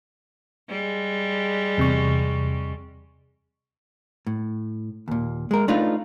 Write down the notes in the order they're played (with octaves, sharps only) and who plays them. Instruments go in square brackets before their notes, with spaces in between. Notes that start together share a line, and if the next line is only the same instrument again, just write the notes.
[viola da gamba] G3 G#3
[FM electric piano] E2 C3 C#6
[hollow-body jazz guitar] A2
D#2 A#2
G#3 A#4
A3 D4 D#4 F4 B4